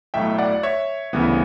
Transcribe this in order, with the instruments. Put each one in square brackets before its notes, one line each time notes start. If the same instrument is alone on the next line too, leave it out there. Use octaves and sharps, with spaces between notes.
[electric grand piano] B1 A2 F#3 A3 E5 G5
D5 F#5
C#5 E5
D2 C#3 E3 G3 B3